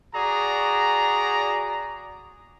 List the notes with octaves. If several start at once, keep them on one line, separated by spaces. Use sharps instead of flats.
F#4 G#4 D5 A#5